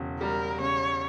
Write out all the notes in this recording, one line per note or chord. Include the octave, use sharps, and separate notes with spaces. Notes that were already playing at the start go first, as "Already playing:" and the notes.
Already playing: E1 C#3
G3 A#4
C#3 C#5